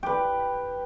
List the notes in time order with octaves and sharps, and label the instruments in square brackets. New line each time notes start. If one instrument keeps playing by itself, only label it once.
[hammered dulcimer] G4 B4